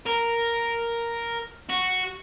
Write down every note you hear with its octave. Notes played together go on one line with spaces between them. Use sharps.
A#4
F#4